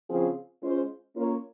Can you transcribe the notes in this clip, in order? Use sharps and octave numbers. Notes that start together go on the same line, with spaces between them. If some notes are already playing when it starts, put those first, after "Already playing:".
C#3 F3 C4 F4 G#4
G#3 C#4 F4 C5
A#3 C#4 F4 A#4 C#5